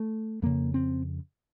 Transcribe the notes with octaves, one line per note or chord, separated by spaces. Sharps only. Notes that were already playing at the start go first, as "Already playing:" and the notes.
Already playing: A3
F2 C#3 A#3
C4